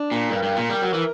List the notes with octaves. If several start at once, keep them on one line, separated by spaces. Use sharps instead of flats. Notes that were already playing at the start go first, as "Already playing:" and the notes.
Already playing: D4
A#2
G2 A#4
G2
A#2
G3
F#3
E3